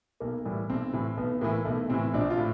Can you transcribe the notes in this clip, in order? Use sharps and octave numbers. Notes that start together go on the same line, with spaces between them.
B1 A#3
A2 E3 G3
B1 C4
A2 E3
B1 B3
A2 E3 A#3
B1 A3
A2 E3 C4
A#1 D4
F4
A2